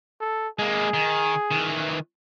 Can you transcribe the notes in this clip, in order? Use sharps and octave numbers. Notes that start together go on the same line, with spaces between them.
A4
G#3 A#3 G#4
D#3
D#3 E3